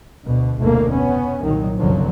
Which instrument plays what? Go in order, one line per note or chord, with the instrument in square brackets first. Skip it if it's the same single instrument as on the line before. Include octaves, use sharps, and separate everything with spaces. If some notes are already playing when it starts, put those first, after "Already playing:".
[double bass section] D2 B2
F1 D2 B2 A3 A#3
B3 C#4
C2 A#2 D#3 F#3
F#1 C2 D3 F3 F#3